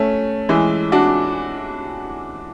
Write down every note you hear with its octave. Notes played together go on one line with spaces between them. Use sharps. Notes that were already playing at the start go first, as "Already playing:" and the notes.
Already playing: A3 C#4
E3 G#3
D4 F#4